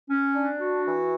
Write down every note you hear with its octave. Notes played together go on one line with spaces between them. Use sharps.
C#4
D4
F#4
E3